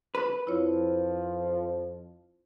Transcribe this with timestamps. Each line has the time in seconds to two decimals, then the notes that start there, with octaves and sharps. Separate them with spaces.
0.15 B4
0.47 F2 F3 E4 F4 C#5